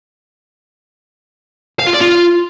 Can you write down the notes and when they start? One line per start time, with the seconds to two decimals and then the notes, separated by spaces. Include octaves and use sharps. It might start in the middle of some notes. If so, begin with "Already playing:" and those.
1.80 F5
1.87 F4
1.94 D5
2.01 F4